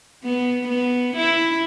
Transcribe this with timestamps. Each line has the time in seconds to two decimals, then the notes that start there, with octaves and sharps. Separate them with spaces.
0.24 B3
0.68 B3
1.16 E4